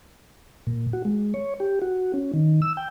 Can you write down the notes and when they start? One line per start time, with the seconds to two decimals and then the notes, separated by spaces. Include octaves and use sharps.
0.67 A#2
0.93 F#4
1.05 G#3
1.34 C#5
1.60 G4
1.82 F#4
2.14 C#4
2.34 D#3
2.62 E6
2.77 G5